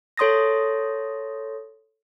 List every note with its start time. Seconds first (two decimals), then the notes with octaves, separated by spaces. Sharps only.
0.17 A4 C#5 C6 D#6 A6 A#6